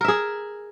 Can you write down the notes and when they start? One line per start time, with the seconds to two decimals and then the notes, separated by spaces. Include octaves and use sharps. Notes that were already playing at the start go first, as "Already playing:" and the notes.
0.01 A#4
0.04 E5
0.08 G#4